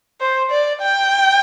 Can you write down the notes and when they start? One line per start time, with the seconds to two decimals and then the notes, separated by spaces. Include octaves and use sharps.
0.20 C5
0.51 D5
0.82 G5